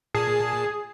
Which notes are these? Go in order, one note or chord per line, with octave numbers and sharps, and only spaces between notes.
A#2 G#4 A5 C7